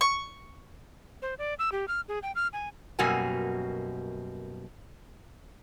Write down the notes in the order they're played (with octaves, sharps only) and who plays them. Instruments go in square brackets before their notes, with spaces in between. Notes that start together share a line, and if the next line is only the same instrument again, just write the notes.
[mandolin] C#6
[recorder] C5
D5
E6
G4
F6
G#4
G5
F6
G#5
[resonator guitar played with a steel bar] F#2 B2 G3 A#3 F#4 G#5